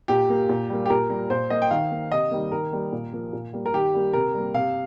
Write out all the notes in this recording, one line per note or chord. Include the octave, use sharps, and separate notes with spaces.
A#2 G4
A#3
A#2
G3 A#3
G4
A#2 A#4
G3 A#3
A#2 C5
A#3 D#5
G5
D#3 F5
A#3
C3 D#5
D#3 G3 A#3
D#3 A#4
G3 A#3
A#2
F3 A#3
A#2
G3 A#3
A#4
D#3 G4
G3 A#3
C3 A#4
G3 A#3
C3 F5